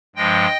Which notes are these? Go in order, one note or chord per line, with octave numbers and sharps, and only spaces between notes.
G2 F3 G#3 D#5 G5